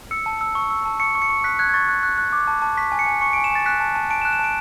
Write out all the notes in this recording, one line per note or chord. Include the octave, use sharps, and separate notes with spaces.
E6 C#7
A5
E6
C#6
E6
A5
C#6 C#7
C#6
C#7
C#6
F#6 B6
F#6 G#6
G#6
C#6 A6
F#6
F#6
F#6
D6
A5
A5
C#6 B6
G#5
C#7
G#5
C#6 C#7
D7
G#5
E7
G#5 A6
F#6 B6
A5
A5
A5 D7
E7
F#6
E7
A5 D7